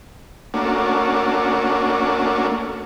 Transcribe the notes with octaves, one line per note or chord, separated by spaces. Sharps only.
A3 A#3 C#4 D4 F#4